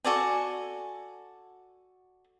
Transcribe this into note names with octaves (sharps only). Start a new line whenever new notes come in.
F#4 A4 D5 G#5